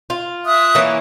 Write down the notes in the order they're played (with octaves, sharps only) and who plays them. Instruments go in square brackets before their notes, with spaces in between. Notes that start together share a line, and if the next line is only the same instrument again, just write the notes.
[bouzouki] F4
[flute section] E5 D#6 F#6
[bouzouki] E3 A#3 C#4